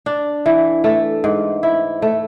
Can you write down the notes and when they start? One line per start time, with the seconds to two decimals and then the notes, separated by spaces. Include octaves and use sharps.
0.06 D4
0.46 E3
0.84 A3
1.24 G#2
1.63 E4
2.02 A3